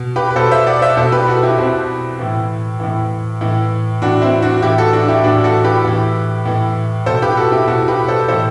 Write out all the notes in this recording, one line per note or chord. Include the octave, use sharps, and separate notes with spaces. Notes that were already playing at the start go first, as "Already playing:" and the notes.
Already playing: B2
G4 B4
B4
B2 A4 C5
C5 E5
D5 F#5
C5 E5
B2 A4 C5
G4 B4
F#4 A4
E4 G4
B2 C4 E4
A2 E3
A2 E3
A2 E3
A2 E3 D4 F#4
C4 E4
D4 F#4
A2 E3 E4 G4
F#4 A4
D4 F#4
E4 G4
A2 E3 D4 F#4
F#4 A4
G4 B4
A2 E3
A2 E3
B2 A4 C5
G4 B4
F#4 A4
E4 G4
B2 F#4 A4
G4 B4
A4 C5
A2 E3 A4 C5